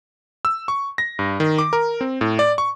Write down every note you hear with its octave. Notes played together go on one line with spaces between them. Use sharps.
E6
C#6
A#6
G2
D#3
D6
A#4
C4
A2
D5
C#6